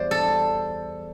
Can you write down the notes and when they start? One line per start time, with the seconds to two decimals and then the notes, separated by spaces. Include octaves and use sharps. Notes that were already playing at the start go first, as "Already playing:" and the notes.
Already playing: E2 G3 C5 D5
0.11 A4